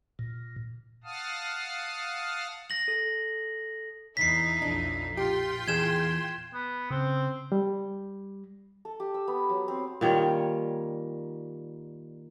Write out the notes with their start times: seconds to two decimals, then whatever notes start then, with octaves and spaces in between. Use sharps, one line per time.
0.19 A#2
1.04 F5 F#5 A5 D#6 F6
2.70 A#6 F#7
2.88 A4
4.17 E2 D#4 E4 B6 C7
4.62 B1 F2 D4
5.17 A#2 F4 G4 G5 C6
5.68 E2 G#4 G#6 E7
6.54 B3
6.91 C#3 C4
7.52 G3
8.85 A4
9.00 G4
9.14 E6
9.28 B3
9.50 F#3
9.68 C4
10.01 A#2 D#3 G3 C#5